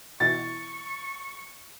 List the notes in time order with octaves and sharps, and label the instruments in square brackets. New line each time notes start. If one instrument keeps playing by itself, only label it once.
[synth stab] B2 E3 [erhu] C#6 [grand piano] A6